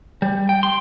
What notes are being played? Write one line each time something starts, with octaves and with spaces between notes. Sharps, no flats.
G3
G5
C6